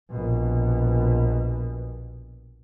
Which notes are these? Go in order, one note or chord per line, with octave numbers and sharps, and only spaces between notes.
A#1 B2